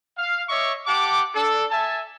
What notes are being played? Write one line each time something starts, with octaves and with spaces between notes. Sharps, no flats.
F5
C#5 D#5 E5 C#6 D6
G4 F#5 A5 D6
D4 A4
E5 G#5 A5